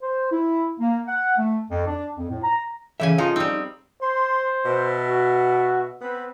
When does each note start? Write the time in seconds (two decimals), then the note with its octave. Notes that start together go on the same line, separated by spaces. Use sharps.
0.02 C5
0.31 E4
0.79 A#3
1.06 F#5
1.36 A3
1.70 F2
1.86 D4
2.17 F2
2.29 A2
2.43 A#5
3.00 A2 C#3 E3 E5 G#5
3.18 F3 D#4 F4 F5
3.36 G3 C4 D#4
4.02 C5 C6
4.66 B2 E5 A5
5.08 F#4
6.01 B3 C4 B4